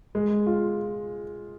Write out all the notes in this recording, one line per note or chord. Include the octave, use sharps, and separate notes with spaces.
G#3
F4